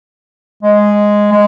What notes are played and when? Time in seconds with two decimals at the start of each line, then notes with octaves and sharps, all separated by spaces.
0.63 G#3
1.32 G#3